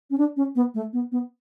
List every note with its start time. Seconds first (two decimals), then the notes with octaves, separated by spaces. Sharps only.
0.10 C#4
0.18 D4
0.37 C#4
0.56 B3
0.74 A3
0.93 B3
1.12 B3